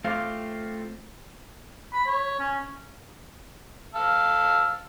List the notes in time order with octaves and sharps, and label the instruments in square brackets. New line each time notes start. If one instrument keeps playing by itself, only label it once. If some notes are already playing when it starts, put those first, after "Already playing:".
[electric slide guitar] A3 C4 F4 [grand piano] F5 D6
[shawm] B5
C#5
C#4
[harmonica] F5 A5 E6